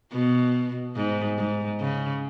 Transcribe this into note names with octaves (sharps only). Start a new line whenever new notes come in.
B2
G#2
G#2
C#3